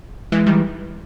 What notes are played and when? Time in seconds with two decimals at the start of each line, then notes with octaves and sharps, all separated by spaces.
0.32 E3 G#3
0.46 D#3 G3